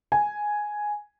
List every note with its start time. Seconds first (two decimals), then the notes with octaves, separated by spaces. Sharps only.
0.12 G#5